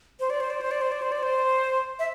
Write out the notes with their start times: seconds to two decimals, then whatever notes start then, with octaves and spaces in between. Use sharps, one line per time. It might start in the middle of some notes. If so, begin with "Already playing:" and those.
0.20 C5
0.30 D5
0.40 C5
0.50 D5
0.61 C5
0.71 D5
0.81 C5
0.92 D5
1.02 C5
1.12 D5
1.23 C5
1.99 E5